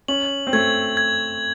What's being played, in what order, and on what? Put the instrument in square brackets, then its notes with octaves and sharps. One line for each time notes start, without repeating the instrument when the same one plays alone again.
[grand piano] C#4 [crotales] F#7
[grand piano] C4
[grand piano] A3 [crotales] G#6
[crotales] G#6